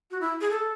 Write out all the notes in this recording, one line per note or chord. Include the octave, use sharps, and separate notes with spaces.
F#4
E4
G#4
A4